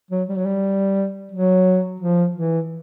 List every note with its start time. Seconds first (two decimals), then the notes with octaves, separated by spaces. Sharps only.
0.11 F#3
0.29 G3
0.38 F#3
0.46 G3
1.32 F#3
2.00 F3
2.36 E3